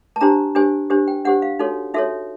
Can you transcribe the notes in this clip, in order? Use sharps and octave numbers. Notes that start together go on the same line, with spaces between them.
A5
D4 G4 C5 A#5
D4 G4 C5 G#5
D4 G4 C5
G5
D4 G4 C5 F#5
F5
D#4 F#4 A4 C#5
D#4 F#4 A4 C#5 E5